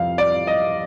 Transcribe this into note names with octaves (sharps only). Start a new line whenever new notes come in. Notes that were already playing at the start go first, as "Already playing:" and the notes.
Already playing: F2 C3 F3 F5
D5
D#5